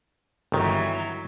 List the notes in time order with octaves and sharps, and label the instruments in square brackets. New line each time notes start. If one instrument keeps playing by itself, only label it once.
[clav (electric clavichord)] G1 D#3 [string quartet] E3 F#3